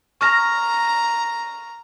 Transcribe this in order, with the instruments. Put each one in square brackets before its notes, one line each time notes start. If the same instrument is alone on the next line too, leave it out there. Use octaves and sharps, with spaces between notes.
[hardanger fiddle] A#5 [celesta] C#6 F6 A#6